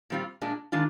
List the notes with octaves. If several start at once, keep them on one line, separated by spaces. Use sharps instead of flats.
A#2 G3 C4 F4
A#2 G#3 D4
D#3 G#3 D4 F4